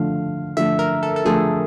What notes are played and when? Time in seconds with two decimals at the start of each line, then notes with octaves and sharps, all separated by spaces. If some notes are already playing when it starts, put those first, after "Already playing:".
Already playing: D3 F3 A3 F5
0.57 D3 F3 A3 E5
0.79 A#4
1.03 A4
1.16 A4
1.25 D3 F3 A3 G#4